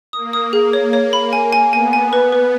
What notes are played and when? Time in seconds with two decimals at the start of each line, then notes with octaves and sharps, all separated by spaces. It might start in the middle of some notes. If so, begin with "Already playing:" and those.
0.13 A#3 D#6
0.33 D#6
0.53 G#4
0.73 C#5
0.93 C#5
1.13 B5
1.33 G#5
1.53 G#5
1.73 B3 G#5
1.93 G#5
2.13 B4
2.33 B4